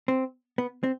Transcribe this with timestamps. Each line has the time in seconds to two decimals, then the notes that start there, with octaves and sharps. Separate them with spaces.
0.08 C4
0.58 B3
0.83 C4